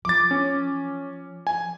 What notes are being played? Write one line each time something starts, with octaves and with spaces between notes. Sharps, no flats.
F3 D6 A6
C#4
G#5